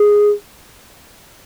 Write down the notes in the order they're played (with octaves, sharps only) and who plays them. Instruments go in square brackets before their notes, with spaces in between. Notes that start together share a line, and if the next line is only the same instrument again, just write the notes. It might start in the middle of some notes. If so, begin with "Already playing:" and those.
Already playing: [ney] G#4